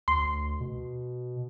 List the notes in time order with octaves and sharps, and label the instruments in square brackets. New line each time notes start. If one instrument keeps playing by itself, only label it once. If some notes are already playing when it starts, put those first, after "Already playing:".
[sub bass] D2 [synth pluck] C6
[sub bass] B2